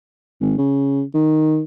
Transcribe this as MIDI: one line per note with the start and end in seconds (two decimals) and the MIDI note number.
0.41 0.54 32
0.58 1.03 49
1.14 1.61 51